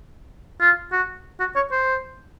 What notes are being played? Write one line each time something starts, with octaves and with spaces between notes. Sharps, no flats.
F4
F#4
F#4
C#5
C5